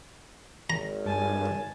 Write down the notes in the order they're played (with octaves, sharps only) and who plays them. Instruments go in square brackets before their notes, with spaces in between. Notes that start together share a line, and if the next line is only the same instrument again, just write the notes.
[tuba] G#1 [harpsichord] A#5
[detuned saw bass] G2 [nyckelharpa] G#5 A5